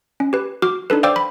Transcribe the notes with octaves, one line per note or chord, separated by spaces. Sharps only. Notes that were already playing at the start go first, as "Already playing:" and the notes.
C#4
G4 B4
F#4 D6 F6
D4 D#4 A4 B4
C5 D5 F5 G5 D6 E6
B5